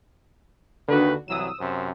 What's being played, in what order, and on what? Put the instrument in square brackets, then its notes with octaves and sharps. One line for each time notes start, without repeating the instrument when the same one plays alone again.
[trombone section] D#2 D#3 B4 [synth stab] D3 F#4
[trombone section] C2 E3 F#3 [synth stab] D#6 E6 E7
[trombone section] F#2 C3 C5